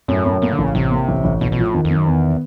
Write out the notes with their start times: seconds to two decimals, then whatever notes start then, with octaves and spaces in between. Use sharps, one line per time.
0.08 F#2 A2
0.25 F#2
0.42 A2 A#3
0.53 D3
0.58 A1
0.64 C#3
0.75 A1 C3
0.91 A#3
1.08 A1
1.24 A1
1.41 A1 B2
1.52 B2
1.57 F3
1.63 A2
1.74 F2 D#3
1.85 F2
1.91 F#2 D#3
2.06 E2 B3